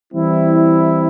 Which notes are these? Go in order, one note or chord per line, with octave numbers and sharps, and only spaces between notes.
E3 G3 C4 E4